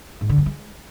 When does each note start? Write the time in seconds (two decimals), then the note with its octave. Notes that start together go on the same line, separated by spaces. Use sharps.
0.21 G#2
0.29 D3
0.38 G2
0.46 G#3